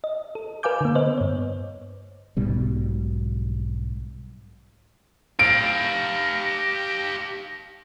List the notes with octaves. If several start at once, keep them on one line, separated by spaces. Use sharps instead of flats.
D#5
A4
A#4 B4 F5 G#5 D6 G6
D3 A#3
B3 B4 C5 D#5
G2 C#5
B1 G#2 B2 G3
G4 F5 A#6 D7